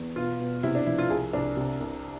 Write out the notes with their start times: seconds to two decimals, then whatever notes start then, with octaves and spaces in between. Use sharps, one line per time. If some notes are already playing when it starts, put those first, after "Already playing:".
Already playing: E2
0.16 B2 F4
0.40 B2
0.63 C3 E4
0.75 D4
0.86 F3 E4
0.98 F4
1.10 C2 G#4
1.33 C2 D4
1.57 C3
1.81 C2